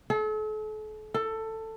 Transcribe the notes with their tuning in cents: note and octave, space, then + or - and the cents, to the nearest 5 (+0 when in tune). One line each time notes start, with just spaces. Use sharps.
A4 -40
A4 +15